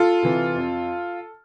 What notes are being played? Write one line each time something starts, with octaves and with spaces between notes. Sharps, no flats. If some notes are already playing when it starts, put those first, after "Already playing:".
Already playing: F4 A4
C3 E3
F2